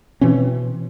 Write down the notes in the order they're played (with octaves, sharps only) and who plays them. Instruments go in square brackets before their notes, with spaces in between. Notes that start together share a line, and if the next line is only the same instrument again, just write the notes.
[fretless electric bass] B2 E3 C4 C#4